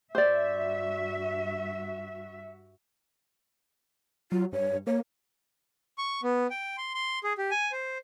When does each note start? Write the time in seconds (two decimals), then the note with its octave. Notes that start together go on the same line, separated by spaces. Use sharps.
0.15 G2 F#4 C5 D5 E5
4.32 F#3 F4
4.53 G2 C#5
4.87 A#3 C#5
5.98 C#6
6.23 B3
6.50 G5
6.77 C6
6.94 C6
7.24 G#4
7.38 G4
7.51 G#5
7.72 C5